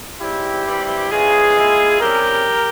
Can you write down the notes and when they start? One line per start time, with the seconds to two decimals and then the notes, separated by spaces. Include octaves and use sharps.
0.20 G#2 G3 C4 E4 G4
0.65 G2 E3 G3 C4 E4
1.10 C#3 E3 G#3 F4 G#4
1.56 A#2 G#3 E4
2.00 C3 G3 C#4 E4 G4 A#4